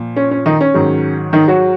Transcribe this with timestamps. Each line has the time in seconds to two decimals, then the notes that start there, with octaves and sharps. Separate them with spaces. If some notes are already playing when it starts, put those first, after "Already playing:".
Already playing: A#2 F3
0.16 C#4
0.31 C#4
0.46 D#3 D#4
0.61 C#4
0.74 G#2 D#3 F#3
1.33 D#3 D#4
1.48 F#3 F#4